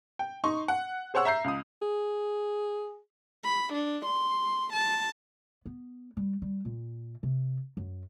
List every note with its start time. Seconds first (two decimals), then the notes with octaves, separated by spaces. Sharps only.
0.19 G5
0.44 D#4 C6 C#6
0.68 F#5
1.14 G#4 C5 C#5 F#5 E6
1.25 E5 A#5 G6 C7
1.44 C#2 D#6
1.82 G#4
3.44 B5
3.73 D4
4.05 C6
4.73 A5
5.66 B3
6.17 G3
6.42 G3
6.65 A#2
7.23 C3
7.77 F#2